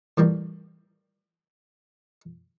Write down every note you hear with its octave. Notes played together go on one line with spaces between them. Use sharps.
A2 E3 G3 A#3